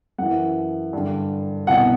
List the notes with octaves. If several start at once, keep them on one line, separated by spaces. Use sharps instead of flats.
F#2 E3 F#5
G2 D3
C2 B2 F#5